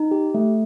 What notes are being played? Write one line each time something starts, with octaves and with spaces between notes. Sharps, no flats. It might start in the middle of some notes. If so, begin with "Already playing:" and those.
Already playing: D#4
G4
A3